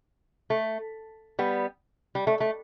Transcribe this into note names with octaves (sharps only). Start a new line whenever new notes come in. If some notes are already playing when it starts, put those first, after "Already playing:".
A3
G3 B3
G3
A3
A3